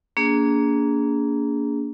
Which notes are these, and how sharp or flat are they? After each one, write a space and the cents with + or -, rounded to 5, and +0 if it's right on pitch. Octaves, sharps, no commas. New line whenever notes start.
A#3 +0 D4 -30 G#4 +0